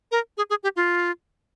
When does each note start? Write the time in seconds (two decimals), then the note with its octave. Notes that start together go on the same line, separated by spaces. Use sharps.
0.11 A#4
0.37 G#4
0.50 G#4
0.63 G4
0.76 F4